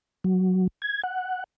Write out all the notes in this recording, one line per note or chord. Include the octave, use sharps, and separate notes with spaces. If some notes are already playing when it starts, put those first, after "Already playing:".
F#3
G#6
F#5